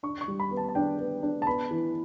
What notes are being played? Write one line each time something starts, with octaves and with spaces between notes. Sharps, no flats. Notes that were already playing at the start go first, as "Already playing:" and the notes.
D4 C#6
C#6
G3
B5
B3
A5
A5
D4 G5
B3
D4
A5
B3 B5
E3